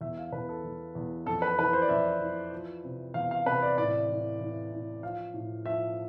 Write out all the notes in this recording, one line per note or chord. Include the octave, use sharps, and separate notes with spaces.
E2 E5
F5
E2 B4
A4
E2
E2
F2 A4
B4
E3 B4
C5
D5
F2 E5
E3
F3
C3
E2 F5
F5
C3 B4
D5
A2 D5
E3
E3
A2
F3 F5
A2
F3 E5